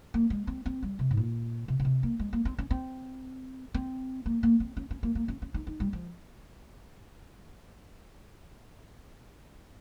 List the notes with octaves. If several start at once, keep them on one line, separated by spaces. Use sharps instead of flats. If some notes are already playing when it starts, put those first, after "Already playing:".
A#3
G#3
C4
C4
G3
C3
G#2
A#2
C3
C#3
C3
A#3
G#3
A#3
C4
C#4
C4
C4
A#3
A#3
C4
C#4
C#4
A#3
A#3
C#4
C#4
D#4
D#4
G3
F3